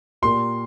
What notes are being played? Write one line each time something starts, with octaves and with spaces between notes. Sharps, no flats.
A#2 A#3 G4 A#4 C6